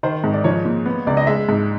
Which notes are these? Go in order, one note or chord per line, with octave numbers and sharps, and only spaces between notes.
D#3 C5
G#2
D5
F3 C#5
A#2
B3
C#2 D5
D#5
G#3 E5
G#2